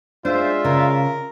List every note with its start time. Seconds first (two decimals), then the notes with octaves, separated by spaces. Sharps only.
0.25 G#3 D4 F4 C5 D5 E5
0.65 C#3 A#4